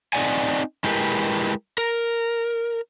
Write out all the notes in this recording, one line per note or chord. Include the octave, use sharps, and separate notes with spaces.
C4 D#4 C5 D5 F#5 G#5
G#3 E4 G4 G#4 A#4 B4
A#4